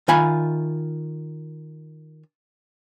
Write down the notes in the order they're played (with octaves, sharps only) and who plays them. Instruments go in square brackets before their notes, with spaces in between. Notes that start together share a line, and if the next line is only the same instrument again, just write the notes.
[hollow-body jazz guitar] D#3 F4 G#5 B5